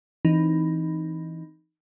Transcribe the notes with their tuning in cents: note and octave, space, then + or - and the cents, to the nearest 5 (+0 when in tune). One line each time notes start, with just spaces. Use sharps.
E3 +0 C4 +0 D#4 +0